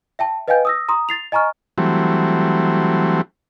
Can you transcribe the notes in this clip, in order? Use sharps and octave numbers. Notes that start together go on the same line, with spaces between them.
E5 G5 A5
B4 D#5 F5 G5 G#5 G6
D#6 E6 A#6
A#5 C6 D#6
A6 C7 F7
D#5 G#5 A#5 C#6 F6
E3 F#3 G3 A3 C4